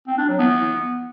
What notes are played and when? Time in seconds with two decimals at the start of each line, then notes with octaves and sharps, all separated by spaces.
0.08 C4
0.18 D4
0.28 F#3
0.39 B3